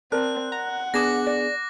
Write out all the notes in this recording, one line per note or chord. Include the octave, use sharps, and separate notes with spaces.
C4 A#4 D5 A5 F#6
F#5 A#5
B3 D4 G#4 D6 A#6
D5